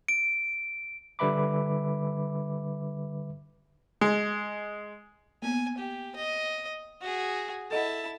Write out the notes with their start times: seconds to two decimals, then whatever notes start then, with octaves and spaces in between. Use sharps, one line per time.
0.08 D7
1.19 D3 G3 B4 E5 B5 D6
4.01 G#3
5.42 A#3 B3 G#5
5.78 G4
6.16 D#5
7.01 F#4 G#4
7.71 E4 A4 D#5 F#5 A5